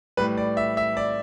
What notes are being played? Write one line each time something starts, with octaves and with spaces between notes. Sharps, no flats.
A2 G3 B4
D5
E5
E5
D5